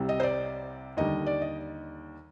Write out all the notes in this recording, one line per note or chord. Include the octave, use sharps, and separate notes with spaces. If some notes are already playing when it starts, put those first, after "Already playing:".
Already playing: C2 C3 G3
D#5
C5
D5
D#2 D3 G3 D#5
D5
D#5